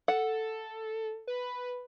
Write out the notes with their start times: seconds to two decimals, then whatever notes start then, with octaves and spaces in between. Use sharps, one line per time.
0.08 A4 F#5
1.27 B4